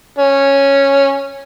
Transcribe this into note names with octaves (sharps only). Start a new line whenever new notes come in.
C#4